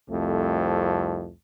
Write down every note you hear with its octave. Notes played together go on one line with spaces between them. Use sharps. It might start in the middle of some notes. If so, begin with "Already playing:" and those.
C2 F2 A3